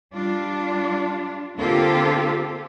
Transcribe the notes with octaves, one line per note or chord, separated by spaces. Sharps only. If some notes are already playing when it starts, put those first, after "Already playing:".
G3 D4 F4
D3 A#3 C4 F4 G4 A4